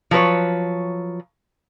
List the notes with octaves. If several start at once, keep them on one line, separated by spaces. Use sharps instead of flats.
F3 F#3 B4 C#5